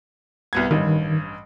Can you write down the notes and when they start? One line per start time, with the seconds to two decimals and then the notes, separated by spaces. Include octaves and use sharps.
0.53 C2 B3 G#6
0.71 A1 G2 D#3